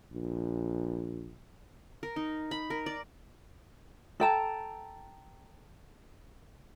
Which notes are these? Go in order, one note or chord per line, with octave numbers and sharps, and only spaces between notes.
A#1
A#4
D#4
B5
A#4
D5
A4 G5 A5 A#5